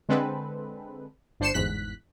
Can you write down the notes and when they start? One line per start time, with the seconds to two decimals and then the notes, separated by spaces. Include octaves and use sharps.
0.09 D3 G#3 C4 A4 B4
1.40 G1 D4 C5 C7 C#7 E7
1.54 G1 E2 G#2 F#6 B6